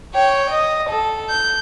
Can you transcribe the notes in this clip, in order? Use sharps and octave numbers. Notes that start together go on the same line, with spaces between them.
C#5 G5
D#5
A4
G6